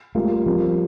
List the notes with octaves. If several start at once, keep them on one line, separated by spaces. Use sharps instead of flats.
G3 A3 A#3 F4 A#4
F3 G3 C4 F4 A#4